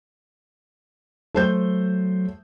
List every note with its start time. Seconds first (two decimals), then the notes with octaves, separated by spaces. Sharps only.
1.35 F#3 A3 C5 G6